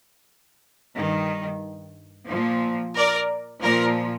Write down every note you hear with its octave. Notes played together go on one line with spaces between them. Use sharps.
G2 D#3
A#2 F3
A#4 D5
A#2 F3 A#4 D5